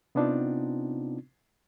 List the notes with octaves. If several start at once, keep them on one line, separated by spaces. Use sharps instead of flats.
C3 B3 C4 D4 D#4 F4